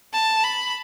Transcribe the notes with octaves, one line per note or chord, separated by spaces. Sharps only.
A5
B5